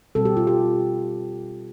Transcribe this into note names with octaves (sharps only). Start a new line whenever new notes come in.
B2 G3 C4 A4
G4
F4
G4